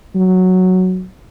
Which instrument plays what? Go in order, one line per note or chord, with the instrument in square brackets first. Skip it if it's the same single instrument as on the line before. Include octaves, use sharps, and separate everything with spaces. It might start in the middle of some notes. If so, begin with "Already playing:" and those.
[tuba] F#3